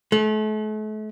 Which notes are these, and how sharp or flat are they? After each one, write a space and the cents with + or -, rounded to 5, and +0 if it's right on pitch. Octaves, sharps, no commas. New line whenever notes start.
A3 -40